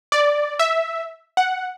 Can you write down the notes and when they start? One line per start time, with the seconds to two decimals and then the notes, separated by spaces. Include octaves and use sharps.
0.12 D5
0.59 E5
1.37 F#5